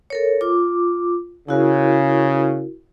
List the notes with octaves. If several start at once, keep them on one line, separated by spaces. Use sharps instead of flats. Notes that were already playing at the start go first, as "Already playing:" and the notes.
A4 A#4 C#5
F4 D6
C#3 E4 F#4 A#4